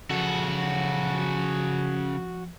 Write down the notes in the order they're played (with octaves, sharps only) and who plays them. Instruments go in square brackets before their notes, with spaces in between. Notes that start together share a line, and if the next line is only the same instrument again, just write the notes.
[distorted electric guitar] C#3 A4 [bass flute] F3 [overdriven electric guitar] F#4